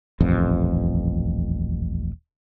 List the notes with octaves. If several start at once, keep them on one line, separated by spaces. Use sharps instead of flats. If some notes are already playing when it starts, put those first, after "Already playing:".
D#1 A1 F2